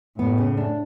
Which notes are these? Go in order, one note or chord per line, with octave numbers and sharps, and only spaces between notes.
A2 B3
C#3
D4